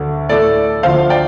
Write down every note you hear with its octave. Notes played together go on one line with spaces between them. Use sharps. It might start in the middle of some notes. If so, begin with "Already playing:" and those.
Already playing: D2 D3 A3
A2 A3 A4 D5
D2 D3 F3 A3 C5 F5
D5 G5